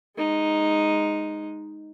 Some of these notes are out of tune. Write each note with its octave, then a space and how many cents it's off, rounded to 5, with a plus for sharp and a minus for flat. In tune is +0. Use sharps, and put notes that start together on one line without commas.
G#3 -5 D#4 +0